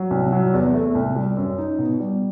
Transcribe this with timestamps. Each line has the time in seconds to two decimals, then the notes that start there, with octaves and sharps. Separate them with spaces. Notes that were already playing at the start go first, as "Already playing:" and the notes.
Already playing: F#3
0.11 C2
0.32 F#3
0.53 E2
0.74 A3
0.95 C2
1.16 G3
1.37 F#2
1.58 D#4
1.78 B2
1.99 G3